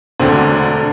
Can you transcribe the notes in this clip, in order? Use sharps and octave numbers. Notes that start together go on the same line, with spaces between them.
E1 D2 D3 C4 D4